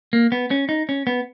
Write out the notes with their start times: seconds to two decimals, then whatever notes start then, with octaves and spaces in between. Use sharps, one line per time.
0.13 A#3
0.32 B3
0.51 C#4
0.69 D#4
0.89 C#4
1.07 B3